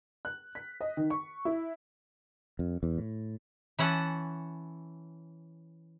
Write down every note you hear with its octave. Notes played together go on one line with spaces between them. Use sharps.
F#6
B6
D#5
D#3
C#6
E4
F2
E2
A2
E3 C#4 F#5 A5